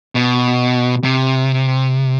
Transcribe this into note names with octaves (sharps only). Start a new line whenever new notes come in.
B2
C3